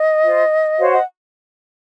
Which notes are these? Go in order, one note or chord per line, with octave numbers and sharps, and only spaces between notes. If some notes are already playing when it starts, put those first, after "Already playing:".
Already playing: D#5
F4 C5
F#4 C5 C#5 F5
D#5 F#5